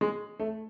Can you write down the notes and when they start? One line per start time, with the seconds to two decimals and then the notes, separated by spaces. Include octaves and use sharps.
0.01 G#3
0.39 A3